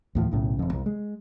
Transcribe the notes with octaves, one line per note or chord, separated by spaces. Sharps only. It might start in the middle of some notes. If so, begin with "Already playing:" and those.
D#2 A2 F3
B1 A2 C#3
E1 F2
C2
G#3